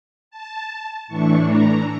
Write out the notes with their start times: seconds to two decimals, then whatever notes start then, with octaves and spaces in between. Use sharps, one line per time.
0.31 A5
1.08 A2 E3 A3 D4 C#6
1.46 A#5